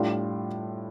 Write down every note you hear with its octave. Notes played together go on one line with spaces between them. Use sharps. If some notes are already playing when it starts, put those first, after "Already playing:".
Already playing: A2 G3 D4 F4